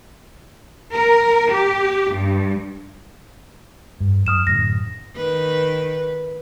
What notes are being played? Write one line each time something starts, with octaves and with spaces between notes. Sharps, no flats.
A#4
G4
G2
G2
F#2 D#6 F6 E7
F#2 A2 D3 A#6
D#3 B4